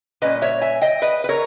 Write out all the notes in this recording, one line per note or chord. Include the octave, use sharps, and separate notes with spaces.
A#2 G3 C#4 B4 D#5
C#5 E5
E5 G#5
D#5 G5
B4 D#5
B4
A#4 C#5